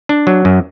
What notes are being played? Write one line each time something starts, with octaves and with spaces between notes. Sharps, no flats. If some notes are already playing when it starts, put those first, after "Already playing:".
D4
F#3
F#2